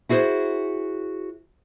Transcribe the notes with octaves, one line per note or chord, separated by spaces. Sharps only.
E4 F#4 G#4 A#4 C5